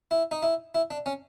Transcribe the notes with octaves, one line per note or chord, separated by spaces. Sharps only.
E4
D#4
E4
E4
D4
C#4